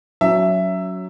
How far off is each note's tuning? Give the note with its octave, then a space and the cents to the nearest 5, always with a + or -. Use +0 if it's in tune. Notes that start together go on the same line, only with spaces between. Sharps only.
F#3 +0 C#4 +20 E5 +10